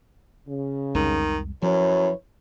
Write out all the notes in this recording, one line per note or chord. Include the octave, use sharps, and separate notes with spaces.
C#3
C2 F2 D#3 G#3
F#2 F3 E4 B4 C#5